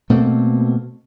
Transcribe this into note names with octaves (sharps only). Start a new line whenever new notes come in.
B2 A3 A#3 C4